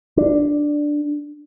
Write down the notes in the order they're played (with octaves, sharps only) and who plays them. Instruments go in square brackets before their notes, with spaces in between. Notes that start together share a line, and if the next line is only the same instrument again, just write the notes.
[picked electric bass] D4